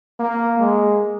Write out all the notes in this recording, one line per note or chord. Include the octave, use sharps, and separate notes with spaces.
A#3
G#3